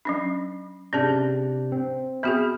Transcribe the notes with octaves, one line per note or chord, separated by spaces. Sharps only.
F#3 C#4 D4
C3 C#4 D4 G#4 A5 G6
C4
B3 F#4 G#4 E5 B5 F6